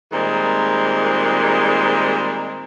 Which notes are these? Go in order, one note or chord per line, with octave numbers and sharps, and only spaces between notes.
A#2 D#3 G3 G#3 C4